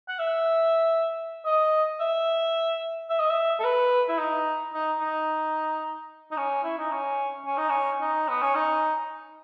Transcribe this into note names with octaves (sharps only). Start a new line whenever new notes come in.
F#5
E5
D#5
E5
E5
D#5
E5
A4
B4
E4
D#4
D#4
D#4
D#4
C#4
E4
D#4
C#4
C#4
D#4
C#4
D#4
B3
C#4
D#4